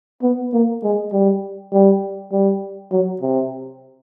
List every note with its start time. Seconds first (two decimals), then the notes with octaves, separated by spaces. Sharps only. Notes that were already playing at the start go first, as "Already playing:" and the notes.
0.23 B3
0.53 A#3
0.83 G#3
1.12 G3
1.72 G3
2.32 G3
2.92 F#3
3.22 C3